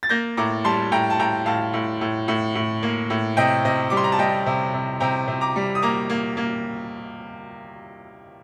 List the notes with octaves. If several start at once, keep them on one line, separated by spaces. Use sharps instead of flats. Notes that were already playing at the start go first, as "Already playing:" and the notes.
A6
A#3 G6 A#6
A2 A#5 D6
G3 A5 C6
A2 G5 A#5
A5
A2 G5 A#5
A2 F5 A5
A2
A2
A2
A2
A#3
A2
C3 D#5 G5
C3 D#5
G3 D6
C6
A#5
A5
G3 D#5 G5
C3
C3
C3 G5 A#5
C3
A#5 D6
G3
D#6
A#3 A#5 D6
A#3
A#3